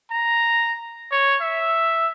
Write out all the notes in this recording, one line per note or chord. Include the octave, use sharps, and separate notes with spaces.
A#5
C#5
E5